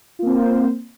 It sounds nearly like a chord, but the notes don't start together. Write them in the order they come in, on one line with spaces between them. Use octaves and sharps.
F4 A#3 C4 C5